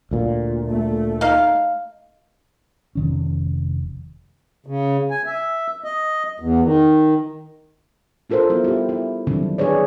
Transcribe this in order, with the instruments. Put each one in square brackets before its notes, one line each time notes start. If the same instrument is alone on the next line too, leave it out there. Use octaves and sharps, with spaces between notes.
[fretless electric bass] D2 A#2
[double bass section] A3
[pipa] D#4 F5
[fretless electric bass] F1 D#3 C#4
[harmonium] C#3
G#5
E5
D#5
E2
D#3
[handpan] D4 F4 A4 A#4 C5
G3 B3 E4 F4
E4 G4
E4
D3 D#3 F#3 G3 C4 D4
D4 G#4 B4 C#5 D5